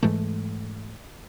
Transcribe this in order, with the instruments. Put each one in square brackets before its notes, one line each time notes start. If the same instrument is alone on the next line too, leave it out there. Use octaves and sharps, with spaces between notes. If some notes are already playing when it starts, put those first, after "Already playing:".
[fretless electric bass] G#2 E3 G#3 A3